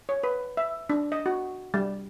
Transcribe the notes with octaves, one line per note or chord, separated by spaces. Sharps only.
C#5
B4
E5
D4
D#5
F#4
G3